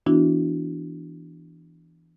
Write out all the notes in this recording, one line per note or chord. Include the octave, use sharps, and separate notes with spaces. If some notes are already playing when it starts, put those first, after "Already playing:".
E3 B3 D4 E4 F#4